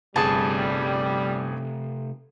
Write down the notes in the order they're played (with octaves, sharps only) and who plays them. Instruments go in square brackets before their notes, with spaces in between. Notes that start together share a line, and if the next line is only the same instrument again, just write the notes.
[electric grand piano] G1 G#4 [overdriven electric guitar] C3 A3 [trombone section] G3 [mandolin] A5